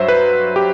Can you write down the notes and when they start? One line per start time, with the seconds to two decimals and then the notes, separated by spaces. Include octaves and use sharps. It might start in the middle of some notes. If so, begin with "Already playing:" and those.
Already playing: G2 F#3 C5 E5
0.08 B4
0.56 G4